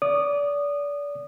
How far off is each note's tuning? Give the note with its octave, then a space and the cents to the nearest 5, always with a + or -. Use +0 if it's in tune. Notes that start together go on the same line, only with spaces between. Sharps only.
D5 -30 D#6 -25